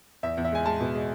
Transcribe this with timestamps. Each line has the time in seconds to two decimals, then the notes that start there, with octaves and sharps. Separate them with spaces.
0.23 E2 E5
0.37 E2
0.45 E5
0.52 G#3 G#5
0.66 G#3 A5
0.80 B2
0.95 G#3